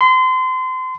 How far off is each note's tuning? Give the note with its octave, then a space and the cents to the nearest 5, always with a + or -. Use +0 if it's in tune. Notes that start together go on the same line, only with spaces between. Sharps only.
C6 -30